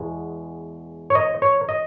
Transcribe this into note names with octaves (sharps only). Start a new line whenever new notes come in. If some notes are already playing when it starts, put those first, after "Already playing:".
Already playing: E2 B2 G#3
C#5
D#5
C#5
D#5